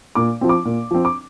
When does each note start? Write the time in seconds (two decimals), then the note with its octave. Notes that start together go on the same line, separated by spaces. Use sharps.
0.15 A#2 D6
0.41 F3 C4
0.49 D6
0.65 A#2
0.91 F3 C4
1.05 D6